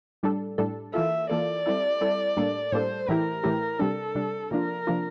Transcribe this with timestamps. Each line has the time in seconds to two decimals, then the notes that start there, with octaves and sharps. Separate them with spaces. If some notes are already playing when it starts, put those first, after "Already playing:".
0.23 A2 G3 D4 A4
0.58 A2 G3 D4 A4
0.94 E3 A#3 F4 A4 E5
1.30 E3 A#3 F4 A4 D5
1.66 G3 C4 E4 A4
2.01 G3 C4 E4 A4
2.37 A2 G3 A#3 D4 A4
2.73 A2 G3 A#3 D4 A4 C5
3.08 A2 E3 A3 E4 G4 A#4
3.44 A2 E3 A3 E4 G4
3.79 C3 G3 D4 A4
4.15 C3 G3 D4
4.51 C3 F3 A#3 D4 F4 A#4
4.87 C3 F3 A#3 D4 F4